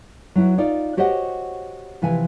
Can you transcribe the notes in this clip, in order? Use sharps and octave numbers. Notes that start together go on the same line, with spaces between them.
F#3 E4 F#4
D#4 F4 D5
F#4 G4 C5 C#5 D#5 F#5
C3 E3 F3 G#5